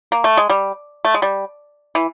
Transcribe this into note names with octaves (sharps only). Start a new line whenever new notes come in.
A#3
A3
G#3
G3
A3
G#3
G3
E3